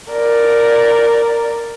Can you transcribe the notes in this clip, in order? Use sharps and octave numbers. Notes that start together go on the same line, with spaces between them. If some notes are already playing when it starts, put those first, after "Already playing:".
A#4 D5